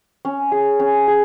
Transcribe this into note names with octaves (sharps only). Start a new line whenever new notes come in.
C#4
G#4
C#4
G#4